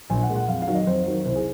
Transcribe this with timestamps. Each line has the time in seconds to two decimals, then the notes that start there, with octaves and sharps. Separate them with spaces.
0.10 A#1 G#5
0.23 F#5
0.29 A#2 G#3
0.36 F#5
0.48 F2 F5
0.62 F5
0.67 D#3 F#3
0.75 D#5
0.87 F2 C5
1.06 D#3 F#3
1.25 C2 C5
1.36 G#4